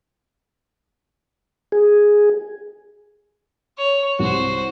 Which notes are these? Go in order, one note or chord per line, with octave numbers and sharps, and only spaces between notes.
G#4
C#5
C2 F#4 C5